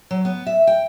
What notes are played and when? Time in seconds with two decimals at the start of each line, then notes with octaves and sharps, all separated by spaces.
0.11 F#3
0.25 B3
0.47 E5
0.67 G5